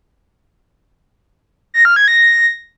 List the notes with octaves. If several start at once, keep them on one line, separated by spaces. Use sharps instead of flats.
A#6
F6
G#6
A#6